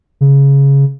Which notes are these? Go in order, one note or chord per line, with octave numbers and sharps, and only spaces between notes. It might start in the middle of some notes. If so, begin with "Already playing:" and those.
C#3